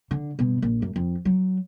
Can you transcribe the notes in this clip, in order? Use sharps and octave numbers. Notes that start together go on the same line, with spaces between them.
D3
G2 B2
A#1
F#2
F2
F#3